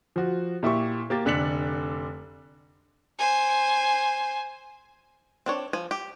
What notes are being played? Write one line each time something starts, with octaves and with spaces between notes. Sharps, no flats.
F3 F#4
A#2 E4 G4 C#6
A#3 G4 A6
F1 D3 D4 B6 C#7 F#7
C5 G#5
C4 D4 C#5
F3 G#5
G4